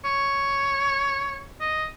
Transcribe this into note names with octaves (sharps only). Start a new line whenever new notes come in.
C#5
D#5